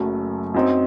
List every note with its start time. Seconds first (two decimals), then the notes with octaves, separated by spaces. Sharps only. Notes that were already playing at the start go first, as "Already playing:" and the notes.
Already playing: F#1 F#2 F#3 A3
0.54 F#2 F#3 C4 D#4